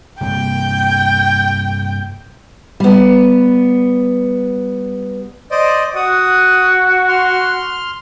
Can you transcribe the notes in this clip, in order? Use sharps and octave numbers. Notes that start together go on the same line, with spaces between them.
G2 C3 A#3 G5
G3 B3
C5 D5 D#5
F#4 F#5 D#6
C6 F6